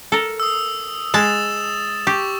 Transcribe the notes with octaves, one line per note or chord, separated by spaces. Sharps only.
A4 A#4
D#6 E6
G#3 A5 D#6 A6 E7
G4 C#6